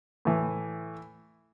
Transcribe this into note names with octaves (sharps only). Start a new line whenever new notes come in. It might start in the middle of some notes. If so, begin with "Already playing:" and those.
A2 E3